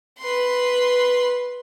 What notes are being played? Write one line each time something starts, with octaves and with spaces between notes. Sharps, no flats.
B4 C6